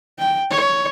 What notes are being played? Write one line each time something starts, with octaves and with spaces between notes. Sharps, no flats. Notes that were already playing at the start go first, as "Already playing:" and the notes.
G5
C#5